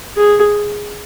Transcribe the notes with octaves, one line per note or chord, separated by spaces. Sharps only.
G#4